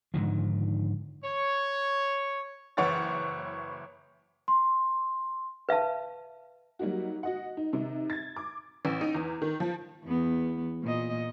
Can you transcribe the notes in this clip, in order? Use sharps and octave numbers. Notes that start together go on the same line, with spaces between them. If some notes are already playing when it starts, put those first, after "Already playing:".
G#2 D3 D#3 F3
C#5
F#1 E3 C#5 F#5 A6
C6
B4 E5 F5 A5
F#3 G3 A#3 D#4 F#4
F#4 D#5 F#5
D#4
C3 D#3 D#4
G#6 A6
D6
A1
D#4
E2
D#3
F3
E2 B3
A#2 D#5